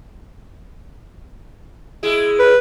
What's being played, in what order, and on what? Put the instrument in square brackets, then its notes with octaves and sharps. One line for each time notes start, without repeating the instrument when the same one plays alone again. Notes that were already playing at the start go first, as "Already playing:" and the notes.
[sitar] G#3 E4 G#4
[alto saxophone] B4